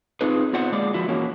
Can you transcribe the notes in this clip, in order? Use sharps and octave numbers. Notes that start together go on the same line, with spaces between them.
C4 D#4 F4 G#4 B4
B3 F4 C5 D5 F#5
G#3 A#3 G#4 D5
F3 E4 F#4
E3 A#3 C#4 F#4